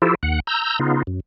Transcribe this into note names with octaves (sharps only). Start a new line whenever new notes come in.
F3 E4 F4 G4 A4
D#2 F#5
A#5 E6 G6
C#3 B3 D#4 F4
F#2